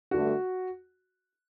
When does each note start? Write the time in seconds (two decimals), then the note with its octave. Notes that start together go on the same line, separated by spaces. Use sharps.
0.11 G2 D3 A3 F#4